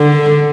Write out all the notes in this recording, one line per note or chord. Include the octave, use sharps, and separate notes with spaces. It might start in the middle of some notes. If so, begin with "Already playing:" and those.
Already playing: D3